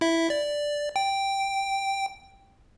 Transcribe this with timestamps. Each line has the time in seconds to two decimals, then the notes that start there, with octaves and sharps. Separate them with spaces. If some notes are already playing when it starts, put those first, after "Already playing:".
0.01 E4 E5
0.30 D5
0.96 G5